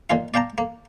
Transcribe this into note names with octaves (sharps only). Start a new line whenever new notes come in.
A#2 D#3 F4 F5
D5 F5 G5 A5 A#5
A#3